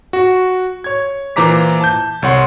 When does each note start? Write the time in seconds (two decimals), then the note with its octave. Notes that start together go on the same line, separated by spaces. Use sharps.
0.13 F#4
0.84 C#5 G#6
1.36 A#2 E3 C5 A#5 D6 B6
1.81 A5 G6
2.22 C2 C#5 F#5 C6